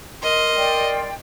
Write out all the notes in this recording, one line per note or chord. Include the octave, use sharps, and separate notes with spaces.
A#4 D#5 C6
D5 G5